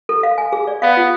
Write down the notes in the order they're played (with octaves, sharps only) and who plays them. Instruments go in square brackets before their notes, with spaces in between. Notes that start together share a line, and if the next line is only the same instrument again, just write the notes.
[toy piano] A4
F5
G#5
G#4
D5
[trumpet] B3 [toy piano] F5
[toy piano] F4